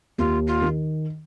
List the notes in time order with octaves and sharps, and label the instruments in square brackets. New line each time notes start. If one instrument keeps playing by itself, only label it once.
[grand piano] D#2 [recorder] F4
[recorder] F4
[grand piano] D#3